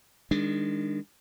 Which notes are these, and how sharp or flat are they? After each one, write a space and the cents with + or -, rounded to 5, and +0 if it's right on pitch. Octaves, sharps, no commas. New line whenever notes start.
D#3 +0 G#3 -30 D4 +0